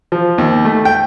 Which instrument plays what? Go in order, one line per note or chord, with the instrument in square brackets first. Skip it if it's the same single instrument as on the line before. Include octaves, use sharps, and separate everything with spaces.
[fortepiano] F3
D#2
A3
G5